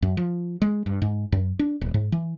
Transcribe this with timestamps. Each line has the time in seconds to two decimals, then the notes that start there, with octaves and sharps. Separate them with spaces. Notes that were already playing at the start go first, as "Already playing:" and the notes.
0.02 F#2
0.17 F3
0.62 G#3
0.86 G2
1.02 G#2
1.32 F#2
1.59 D4
1.81 D#1
1.94 G#2
2.12 E3